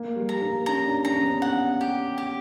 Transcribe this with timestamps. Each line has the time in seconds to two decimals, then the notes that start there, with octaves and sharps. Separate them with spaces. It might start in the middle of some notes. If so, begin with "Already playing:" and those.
Already playing: A#3
0.16 G3
0.29 A#5
0.42 A#3
0.66 C#4 A#5
0.86 D4
1.05 C#4 A#5
1.15 C#4
1.23 B3
1.42 F#5
1.81 G4
2.18 G4